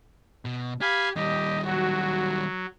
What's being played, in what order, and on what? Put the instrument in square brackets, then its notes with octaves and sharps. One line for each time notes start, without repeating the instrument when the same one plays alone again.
[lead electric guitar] B2
[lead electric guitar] G4 [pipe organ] F5 G#5 B5
[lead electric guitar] D#3 G3 [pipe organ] G4 [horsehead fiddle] D#5
[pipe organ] F#3 [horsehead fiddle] F#4